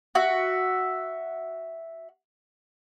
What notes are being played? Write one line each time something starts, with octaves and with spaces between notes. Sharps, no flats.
F#4 E5